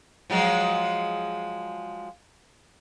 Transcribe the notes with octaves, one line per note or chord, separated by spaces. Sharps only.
F3 F#3 G#3